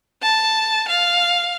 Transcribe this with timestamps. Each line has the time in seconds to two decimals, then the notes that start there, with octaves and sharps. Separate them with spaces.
0.23 A5
0.89 F5